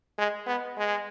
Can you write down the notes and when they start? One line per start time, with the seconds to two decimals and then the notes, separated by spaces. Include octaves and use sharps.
0.18 G#3
0.47 B3
0.77 G#3